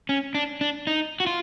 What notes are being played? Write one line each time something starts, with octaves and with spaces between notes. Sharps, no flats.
C#4
D4
D4
D#4
F#4
F4